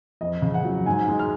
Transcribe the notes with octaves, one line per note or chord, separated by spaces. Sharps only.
F2 D#5
C#3
F#5
F#3
G#2 G#5
G#3
F6